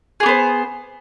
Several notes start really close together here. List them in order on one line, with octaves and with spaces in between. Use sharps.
G#4 G4 B3 C5